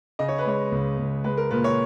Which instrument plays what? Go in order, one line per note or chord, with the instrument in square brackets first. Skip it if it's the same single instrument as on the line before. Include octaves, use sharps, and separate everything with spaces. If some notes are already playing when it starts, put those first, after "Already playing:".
[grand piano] C#3 D#5
C#5
B4
G#3 C#5
C#2
C#2
G#3 B4
A#4
A#2 B4
C#5